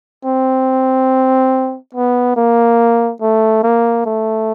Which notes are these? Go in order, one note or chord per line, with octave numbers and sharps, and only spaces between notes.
C4
B3
A#3
A3
A#3
A3